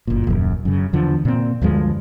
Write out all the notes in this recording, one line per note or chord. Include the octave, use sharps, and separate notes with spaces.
F#1 A#2
D#1 F#2
F#2 C#3
E2 D3 F3
A#2 C4
D2 G2 F3 G#3